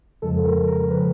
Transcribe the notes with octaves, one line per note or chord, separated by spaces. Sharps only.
F2 C#3 F3 G#3 A4
A#4
A#4
C#3 F3 G#3 B4